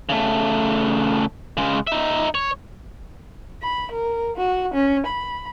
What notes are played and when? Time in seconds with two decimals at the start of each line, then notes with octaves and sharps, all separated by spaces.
0.09 C#3 A3
1.57 C#3 G#3
1.87 D#4 E5
2.35 C#5
3.62 B5
3.92 A#4
4.37 F#4
4.74 C#4
5.06 B5